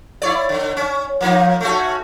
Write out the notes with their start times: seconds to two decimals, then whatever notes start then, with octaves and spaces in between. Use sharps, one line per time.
0.22 E4 C#5 D5
0.49 D3
0.77 C#4
1.20 F3 A#3 D#4
1.60 A3 C#4 F#4